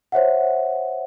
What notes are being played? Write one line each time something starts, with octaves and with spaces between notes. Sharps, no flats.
C5 C#5 E5 F#5